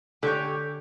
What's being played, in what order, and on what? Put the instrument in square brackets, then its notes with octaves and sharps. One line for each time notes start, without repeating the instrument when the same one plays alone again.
[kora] D3 [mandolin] G4 C#5 G5